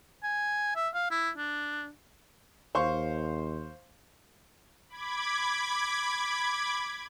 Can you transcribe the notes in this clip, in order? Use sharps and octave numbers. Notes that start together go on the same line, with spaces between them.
G#5
E5
F5
E4
D4
D#2 C5 F5 C#6
B5 D6 G#6